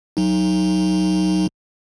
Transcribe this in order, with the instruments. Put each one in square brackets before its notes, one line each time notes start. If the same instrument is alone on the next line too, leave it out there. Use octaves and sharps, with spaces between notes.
[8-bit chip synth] F#3 D#4